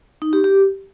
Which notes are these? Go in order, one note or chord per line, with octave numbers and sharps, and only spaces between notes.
D#4
G4
G4